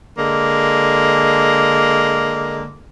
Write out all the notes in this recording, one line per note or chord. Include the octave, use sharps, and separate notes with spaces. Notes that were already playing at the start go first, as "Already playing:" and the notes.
D3 G#3 A#3